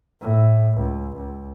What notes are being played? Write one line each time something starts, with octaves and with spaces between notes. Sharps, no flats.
A2
C#2
C#2